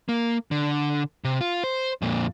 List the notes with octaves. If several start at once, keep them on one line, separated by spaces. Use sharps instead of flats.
A#3
D3
C3
F4
C5
F2 A#2